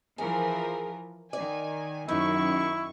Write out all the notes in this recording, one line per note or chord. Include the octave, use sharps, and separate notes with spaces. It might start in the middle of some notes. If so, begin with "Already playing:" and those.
E3 F3 G#4 A#4
D#3 D5 G#5
F#2 D#3 D#4 E4 C#6